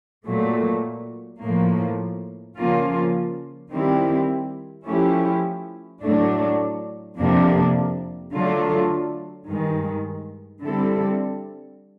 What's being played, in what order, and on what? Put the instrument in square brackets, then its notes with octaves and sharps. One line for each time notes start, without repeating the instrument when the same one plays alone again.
[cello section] A#2 F#3 A3
A2 F3 A#3
C#3 F3 A#3 C#4 F4
D#3 G3 C4 E4 G4
F3 A3 C#4 E4 G4
A2 F#3 A3 D4
F2 C3 F3 A#3 D4
D3 F#3 A3 D4 F4
G2 D#3 G#3
D3 G3 C4 E4 A4